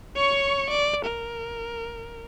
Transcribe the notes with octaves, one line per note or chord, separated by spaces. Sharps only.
C#5 C#6
D5
A#4